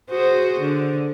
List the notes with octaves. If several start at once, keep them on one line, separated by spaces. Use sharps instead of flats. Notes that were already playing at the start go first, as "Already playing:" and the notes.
F#4 G#4 C5
D3